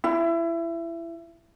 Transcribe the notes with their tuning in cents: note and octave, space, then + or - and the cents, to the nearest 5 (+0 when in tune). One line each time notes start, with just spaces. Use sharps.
E4 +25